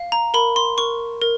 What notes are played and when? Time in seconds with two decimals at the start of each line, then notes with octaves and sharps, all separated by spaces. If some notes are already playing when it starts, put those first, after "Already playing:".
Already playing: F5
0.12 A#5
0.34 A#4 B5
0.56 C6
0.78 A#4 C#6
1.21 A#4